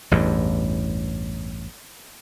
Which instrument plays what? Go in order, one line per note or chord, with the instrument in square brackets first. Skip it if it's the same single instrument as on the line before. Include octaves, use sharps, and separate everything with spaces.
[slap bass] A1 E2 G2